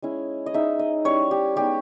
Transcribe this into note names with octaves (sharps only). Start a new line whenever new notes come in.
G#3 C#4 E4
D#5
G#3 D#4 E5
D#5
G3 C#4 E4 C#5
G4
G#3 B3 D#4 G4